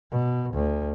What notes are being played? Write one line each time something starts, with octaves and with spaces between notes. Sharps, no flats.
B2
D2